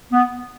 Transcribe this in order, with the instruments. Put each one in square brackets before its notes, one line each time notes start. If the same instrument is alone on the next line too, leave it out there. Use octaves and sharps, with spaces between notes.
[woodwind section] B3